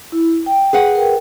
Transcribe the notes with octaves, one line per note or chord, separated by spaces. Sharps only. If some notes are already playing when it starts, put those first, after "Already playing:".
E4
G5
G#4 B4 F#5
A#4 G5